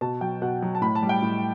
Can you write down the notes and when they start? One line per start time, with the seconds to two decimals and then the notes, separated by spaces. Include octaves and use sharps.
0.01 B2 A5
0.21 F#3 G5
0.42 B2 F#5
0.62 F#3
0.75 A5
0.81 A2 B5
0.95 A5
1.02 G3
1.09 G5
1.22 A2